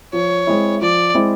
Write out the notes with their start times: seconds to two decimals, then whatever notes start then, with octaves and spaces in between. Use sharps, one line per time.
0.13 F3 C#5
0.47 G#3 C4 E4
0.81 F3 D5
1.14 G#3 C4 E4